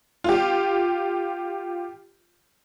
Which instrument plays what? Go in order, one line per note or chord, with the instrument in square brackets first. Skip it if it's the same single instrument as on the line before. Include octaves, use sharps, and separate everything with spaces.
[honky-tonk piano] F4 G4